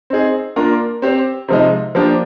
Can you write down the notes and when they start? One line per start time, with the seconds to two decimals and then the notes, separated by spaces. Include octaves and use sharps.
0.10 C4 D#4 G#4
0.56 A#3 D4 F4 A#4
1.02 C4 G4 C5
1.48 C3 F3 G#3 D#4
1.95 F3 A#3 D4 G4